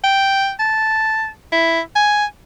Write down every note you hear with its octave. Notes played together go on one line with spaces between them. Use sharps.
G5
A5
E4
G#5